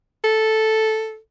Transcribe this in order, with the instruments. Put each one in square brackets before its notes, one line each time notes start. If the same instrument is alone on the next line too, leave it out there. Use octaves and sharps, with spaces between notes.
[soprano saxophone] A4